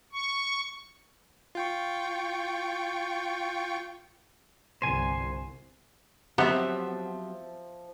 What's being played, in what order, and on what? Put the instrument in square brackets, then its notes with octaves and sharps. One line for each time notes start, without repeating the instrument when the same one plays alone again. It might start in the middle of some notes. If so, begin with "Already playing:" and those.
[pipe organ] C#6
[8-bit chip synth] F4 G5 C#6
[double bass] G1 C2 [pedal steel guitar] C5 G#5
[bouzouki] F3 E5 [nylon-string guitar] F#3 C4 G4 [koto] B3